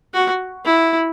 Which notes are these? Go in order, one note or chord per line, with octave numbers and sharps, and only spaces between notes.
F#4
E4